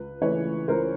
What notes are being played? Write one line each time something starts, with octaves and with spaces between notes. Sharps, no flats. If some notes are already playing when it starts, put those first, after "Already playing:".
Already playing: C#2 B4
C#3 E3 A3 C#4 B4 C#5
C#2 A#4 C5